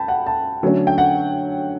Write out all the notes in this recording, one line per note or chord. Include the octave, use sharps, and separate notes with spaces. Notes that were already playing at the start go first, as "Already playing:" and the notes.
Already playing: G5 A5 B5
F#5
A5
D3 F#3 A3 C#4
G5
F#5